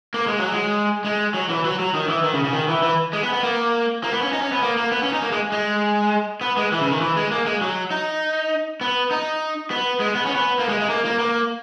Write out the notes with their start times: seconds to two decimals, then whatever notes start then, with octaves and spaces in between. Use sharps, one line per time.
0.14 A#3
0.27 G#3
0.39 F#3
0.52 G#3
1.04 G#3
1.34 F#3
1.50 E3
1.65 F#3
1.80 F#3
1.94 D#3
2.08 E3
2.24 D#3
2.34 C#3
2.44 C#3
2.53 D#3
2.68 E3
2.83 E3
3.13 G#3
3.23 B3
3.33 B3
3.43 A#3
4.03 A#3
4.12 B3
4.22 C#4
4.33 D#4
4.42 C#4
4.52 B3
4.63 A#3
4.77 A#3
4.92 B3
5.03 C#4
5.13 D#4
5.22 A#3
5.32 G#3
5.52 G#3
6.41 B3
6.57 G#3
6.72 E3
6.81 C#3
6.91 D#3
7.01 E3
7.17 G#3
7.31 A#3
7.46 G#3
7.61 F#3
7.91 D#4
8.81 B3
9.11 D#4
9.71 B3
10.00 G#3
10.15 B3
10.26 C#4
10.35 B3
10.59 A#3
10.69 G#3
10.80 G#3
10.89 A#3
11.05 A#3
11.19 A#3